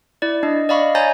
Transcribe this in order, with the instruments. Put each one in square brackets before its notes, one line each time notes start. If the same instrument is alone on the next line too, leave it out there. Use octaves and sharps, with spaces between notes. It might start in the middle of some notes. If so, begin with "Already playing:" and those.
[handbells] E4 D5
D4 D#5
D5 D#5 F5 B5 C#6
C#5 D#5 G#5 A#5 G6 A6